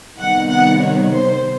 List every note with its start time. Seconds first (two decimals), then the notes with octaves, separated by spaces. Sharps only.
0.19 C3 D#3 G3 B3 F#5
0.49 F#5
0.80 C#5
1.11 C5